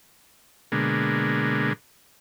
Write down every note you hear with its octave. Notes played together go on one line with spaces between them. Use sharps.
B2 D3 G#3 A#3